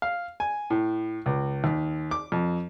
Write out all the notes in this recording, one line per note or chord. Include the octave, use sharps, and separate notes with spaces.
F5
G#5
A2
C#2
D#2
D6
F2